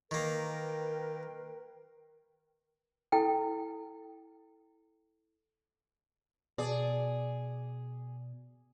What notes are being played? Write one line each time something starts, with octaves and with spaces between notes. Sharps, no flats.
D#3 A#3 A#4 B4 G5
E4 A4 G5
B2 G#4 D5